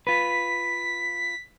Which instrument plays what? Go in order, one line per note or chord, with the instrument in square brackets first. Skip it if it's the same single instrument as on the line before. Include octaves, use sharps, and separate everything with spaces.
[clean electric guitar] F4 B4 [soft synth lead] B6